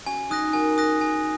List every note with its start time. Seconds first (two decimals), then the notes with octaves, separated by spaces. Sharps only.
0.06 C#4 F#4 G#5
0.30 D#4 G#4 D#6 F#6 A#6
0.53 F#4 A#4 G#5
0.78 D#6 F#6 A#6
1.01 G#5